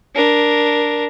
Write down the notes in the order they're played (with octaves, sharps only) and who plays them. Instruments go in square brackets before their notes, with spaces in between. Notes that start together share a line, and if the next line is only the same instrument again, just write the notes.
[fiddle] D4 A#4